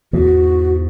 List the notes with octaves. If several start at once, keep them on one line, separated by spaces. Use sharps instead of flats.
E2 G#2 F#4